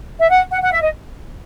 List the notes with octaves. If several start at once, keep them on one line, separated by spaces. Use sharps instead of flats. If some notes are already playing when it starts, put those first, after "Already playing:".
E5
F#5
F#5
F#5
E5
D#5